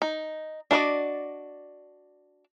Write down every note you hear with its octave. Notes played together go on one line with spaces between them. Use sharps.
D#4
D4 F#4 A#4 D5 D#5